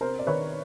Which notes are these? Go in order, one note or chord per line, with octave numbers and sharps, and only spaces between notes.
C3 A#4 C5
D5
D#3 B4 C#5